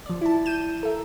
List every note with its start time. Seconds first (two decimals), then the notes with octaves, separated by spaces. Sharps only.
0.06 F3 D5
0.21 E4 A5
0.46 G6 D#7 E7
0.83 A4 A#4 E5